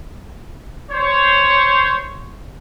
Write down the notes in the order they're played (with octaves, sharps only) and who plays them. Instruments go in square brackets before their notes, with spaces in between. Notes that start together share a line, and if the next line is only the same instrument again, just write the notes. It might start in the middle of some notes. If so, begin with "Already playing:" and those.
[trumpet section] C5 C#5